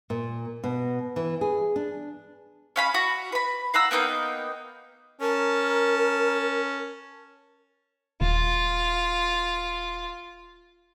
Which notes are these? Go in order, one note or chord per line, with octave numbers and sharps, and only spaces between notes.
A#2
B2
E3
G#4
D4
C#4 F5 B5
F#4
B4 B5
F5 F#5 A#5 E6
A#3 B3 D#4 G5
C#4 A#4 A5
D#1 F4